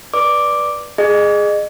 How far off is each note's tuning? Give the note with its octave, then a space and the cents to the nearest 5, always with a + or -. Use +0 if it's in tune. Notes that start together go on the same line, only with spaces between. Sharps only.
B4 -15 D5 +0 D6 +0
G#4 +0 D#5 -30